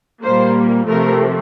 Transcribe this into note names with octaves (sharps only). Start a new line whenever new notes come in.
A#2 G3 A#3 C5
C3 F3 A3 A#4